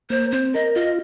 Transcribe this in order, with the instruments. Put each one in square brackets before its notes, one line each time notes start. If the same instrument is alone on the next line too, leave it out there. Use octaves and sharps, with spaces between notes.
[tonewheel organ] A#3 [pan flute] C5
[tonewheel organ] C4 [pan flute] C5
[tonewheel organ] A#4 [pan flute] D#5
[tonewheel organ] F4 [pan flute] D#5